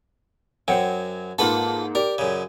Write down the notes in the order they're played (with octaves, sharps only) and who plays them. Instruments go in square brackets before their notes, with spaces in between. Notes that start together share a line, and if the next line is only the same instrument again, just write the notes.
[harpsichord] F#2 F#3 [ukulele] C5 F#5 G5
[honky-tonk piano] G#2 A#3 [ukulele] F4 A5 [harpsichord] A4 B4 F#5
[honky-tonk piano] G4 [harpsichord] A#4 [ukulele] D5
[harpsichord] F#2 C#3